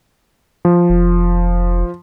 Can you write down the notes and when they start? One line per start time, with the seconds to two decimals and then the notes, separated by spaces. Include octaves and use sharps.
0.65 F3
0.90 F1